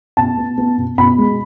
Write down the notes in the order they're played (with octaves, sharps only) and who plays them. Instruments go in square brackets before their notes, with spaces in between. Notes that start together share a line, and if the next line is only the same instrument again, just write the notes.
[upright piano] B2 A5
B3
B3
B2
B2 B5
G#3